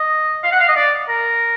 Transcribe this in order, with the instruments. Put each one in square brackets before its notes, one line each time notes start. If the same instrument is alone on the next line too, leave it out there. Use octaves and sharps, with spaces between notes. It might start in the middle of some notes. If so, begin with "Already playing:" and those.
Already playing: [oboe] D#5
F5
F#5
F5
D#5
D5
A#4